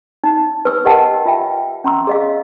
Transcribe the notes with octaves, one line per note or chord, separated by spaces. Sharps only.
D#4
B4 E6
G4 A#4 D#5 F#5 G5 A5
F4 E5 G5
C#4 A#5 C6 E6
G#4 D#5 F5